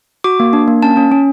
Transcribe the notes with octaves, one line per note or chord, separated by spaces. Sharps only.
F#4 D6
A#3
D4
A#3
C#4 A5
C#4
C#4